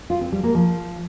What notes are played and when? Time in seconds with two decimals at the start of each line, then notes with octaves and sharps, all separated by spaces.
0.10 F4
0.21 C4
0.32 G3
0.43 A#3
0.55 F3